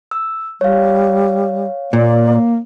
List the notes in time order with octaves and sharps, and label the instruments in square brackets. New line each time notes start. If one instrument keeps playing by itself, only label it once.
[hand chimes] E6
[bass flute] G3 [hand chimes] C#5 F5
[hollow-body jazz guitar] A#2 [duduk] A#3 [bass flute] D5